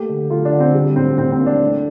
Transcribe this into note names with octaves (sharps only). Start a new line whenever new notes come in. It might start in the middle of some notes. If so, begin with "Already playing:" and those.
Already playing: A3 A#3 G4
D3
A3 F4
D4
D3
C4
G3
A2 C4
A2 C4
C4
A#3
D4
A3